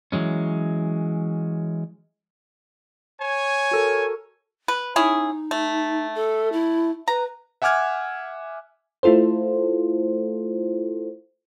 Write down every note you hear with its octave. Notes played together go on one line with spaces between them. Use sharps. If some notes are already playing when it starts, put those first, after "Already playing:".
E3 F#3 G#3 C#4
C#5 G#5
F#4 A4 A#4
B4
C#4 D#4 E4 G#4
A3
A4
E4
B4 A#5
E5 F#5 G#5 D6 F6 G#6
A3 E4 F4 A4 C5